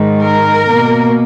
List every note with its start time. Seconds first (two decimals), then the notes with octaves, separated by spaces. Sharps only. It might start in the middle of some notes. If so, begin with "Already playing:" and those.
Already playing: G#2 D#3 G#3
0.23 A#4
0.67 B2 A#3